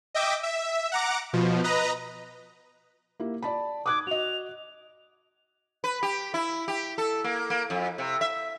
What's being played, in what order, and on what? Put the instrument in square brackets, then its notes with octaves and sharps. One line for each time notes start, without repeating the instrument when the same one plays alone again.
[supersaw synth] D#5 E5 G5 D6
E5
F#5 A#5 D6
B2 F3
B4 D#5 A#5
[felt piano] A#3 E4 G4
D5 A5 B5
[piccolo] D6 [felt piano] D#6 F#6 G#6
[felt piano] F#4 D#5 [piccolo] F7
[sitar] B4
G4
E4
G4
A4
A#3
A#3
F2
C3
E5